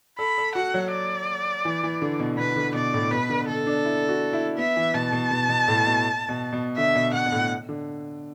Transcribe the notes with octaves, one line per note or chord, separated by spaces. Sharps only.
A4 B5
A4
F#4 F#5
F#3
D5
E3
E3
D3
B2
B2 B4
D3
B2 D5
A2
B2 B4
D3
D3 A4
D4
E4
F#4
E4
B3 E5
E3
B2 A5
B2
B2
B2
A2
B2
B2
B2
D3 E5
B2
B2 F#5
B2
A2
D3